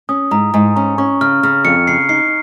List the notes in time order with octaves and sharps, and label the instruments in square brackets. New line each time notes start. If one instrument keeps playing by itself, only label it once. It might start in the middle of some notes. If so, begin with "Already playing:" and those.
[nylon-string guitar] C#4 [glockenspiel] D#6
[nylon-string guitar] G#2 [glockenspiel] A#5
[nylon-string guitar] G#2 [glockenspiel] G#5
[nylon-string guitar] C#4 [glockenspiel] A#5
[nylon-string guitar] C#4 [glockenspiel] C#6
[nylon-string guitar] C#3 [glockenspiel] F6
[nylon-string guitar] C#3 [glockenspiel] F6
[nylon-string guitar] F2 [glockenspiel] C#7
[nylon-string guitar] C#3 [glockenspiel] C7
[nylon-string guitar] D#4 [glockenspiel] C7